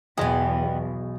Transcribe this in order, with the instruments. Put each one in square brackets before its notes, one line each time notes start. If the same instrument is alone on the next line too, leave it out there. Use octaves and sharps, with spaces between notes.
[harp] B1 B2 [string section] E2 [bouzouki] G3 B3 [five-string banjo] G#3 G#4